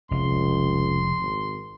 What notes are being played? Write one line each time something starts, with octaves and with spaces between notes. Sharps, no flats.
F1 C#2 C6
G#1